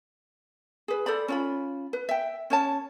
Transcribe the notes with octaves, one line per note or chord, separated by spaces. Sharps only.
G#4 B4
A4 C5 D5 B5
C#4 F4 B5
B4
E5 G5
C#4 C#5 A5